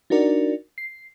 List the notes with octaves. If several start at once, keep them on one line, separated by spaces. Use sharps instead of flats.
D4 D#4 F#4 A#4 D5
C7